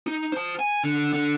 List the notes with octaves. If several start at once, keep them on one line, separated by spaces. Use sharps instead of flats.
D#4
C5 A5
G#5
D3
D3